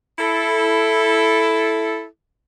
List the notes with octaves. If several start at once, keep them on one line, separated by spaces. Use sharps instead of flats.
E4 A4